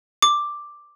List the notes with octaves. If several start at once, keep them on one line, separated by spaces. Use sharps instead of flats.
D6